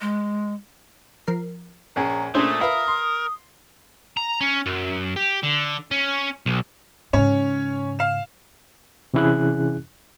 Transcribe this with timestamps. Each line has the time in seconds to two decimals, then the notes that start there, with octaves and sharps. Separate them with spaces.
0.01 G#3
1.27 F3 A#4 C7
1.96 A#1 C#4 G#4 A#5
2.35 A#2 A3 C#4 D4 G#4 C5 D#6
2.61 F4 A#4 B4 E5 F5 B5
2.88 C6
4.17 A#5
4.41 C#4
4.66 F#2
5.16 G4
5.43 D3
5.91 C#4
6.46 B1
7.13 G#2 C#3 C#4 C#5
7.99 F5 E7
9.14 C3 E3 C#4 E4 G#4 F#6